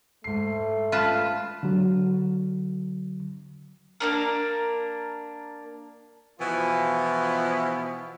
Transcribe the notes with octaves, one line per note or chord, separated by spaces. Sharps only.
G#2 A3 C7
F4 B4 A5
D3 F#3
A#3 D4 A#4
B2 E3 F3 B3 F4